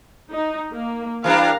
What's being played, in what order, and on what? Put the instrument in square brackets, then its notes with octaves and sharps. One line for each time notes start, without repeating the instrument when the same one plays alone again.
[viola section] D#4
A#3
[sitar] E3 G3 D4 [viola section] A#4 F5 A#5